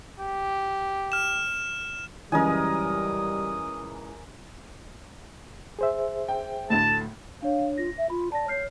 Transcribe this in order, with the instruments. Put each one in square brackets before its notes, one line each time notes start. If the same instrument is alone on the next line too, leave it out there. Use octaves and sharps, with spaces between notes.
[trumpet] G4
[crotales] F6 E7
[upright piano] C#2 F#2 E3 [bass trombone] G3 [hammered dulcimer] A#4 D#5 G#5 [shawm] D#6
[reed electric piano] G#4 C5 E5
[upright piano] G5
[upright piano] D2 A2 [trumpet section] A5
[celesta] D4 C#5 [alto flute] F5
[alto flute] F4 [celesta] A#6
[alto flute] E5
[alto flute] F4 [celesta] B5
[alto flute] D5 [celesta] A5 A#6
[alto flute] C#5 [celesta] F6 G6 C7